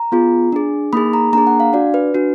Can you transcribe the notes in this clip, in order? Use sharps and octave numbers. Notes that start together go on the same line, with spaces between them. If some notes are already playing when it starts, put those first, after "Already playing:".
Already playing: A#5
B3 F4 G#4
D4 G#4
A#3 D#4 G#4 B5
A#5
A#3 D4 G#4 A#5
F#5
F5
D4 F#4 D5
B4
D4 F#4